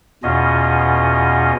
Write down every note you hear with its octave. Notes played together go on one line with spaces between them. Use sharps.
E2 B2 C#4 F4 D#5